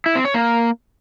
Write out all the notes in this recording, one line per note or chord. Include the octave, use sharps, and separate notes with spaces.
E4
C4
C#5
A#3